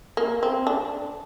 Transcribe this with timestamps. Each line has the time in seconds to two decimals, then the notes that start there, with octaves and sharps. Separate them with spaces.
0.17 A#3
0.43 C4
0.67 D4